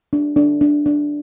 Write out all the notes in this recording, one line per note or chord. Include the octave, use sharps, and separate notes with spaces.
D4
D4
D4
D4